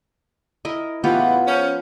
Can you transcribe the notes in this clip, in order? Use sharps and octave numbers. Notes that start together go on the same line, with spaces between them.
E4 A#4 D#5
A2 C#3 E3 B3 F4 G4
F3 C#4